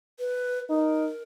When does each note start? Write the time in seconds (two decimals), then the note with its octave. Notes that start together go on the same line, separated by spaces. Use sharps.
0.19 B4
0.69 D#4 A#4